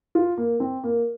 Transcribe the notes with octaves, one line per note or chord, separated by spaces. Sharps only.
F4
A#3
C4
A#3